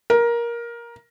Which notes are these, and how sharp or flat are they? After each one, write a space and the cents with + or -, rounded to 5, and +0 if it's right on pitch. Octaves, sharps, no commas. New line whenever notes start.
A#4 +15